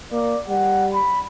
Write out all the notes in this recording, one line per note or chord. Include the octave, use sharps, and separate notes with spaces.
A#3 D5
G3 F#5
B5